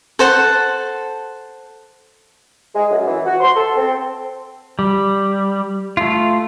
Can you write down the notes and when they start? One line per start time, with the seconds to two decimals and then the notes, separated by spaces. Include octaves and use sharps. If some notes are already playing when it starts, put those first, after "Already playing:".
0.19 A4 C5 F#5 A5
2.75 G#3
2.91 F#2
3.06 E3
3.25 F#4
3.41 C6
3.56 A4
3.77 C4
4.79 G3
5.97 A3 F4